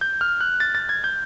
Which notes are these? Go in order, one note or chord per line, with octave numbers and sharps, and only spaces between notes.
G6
F6
F#6
A6
A6
G#6
G6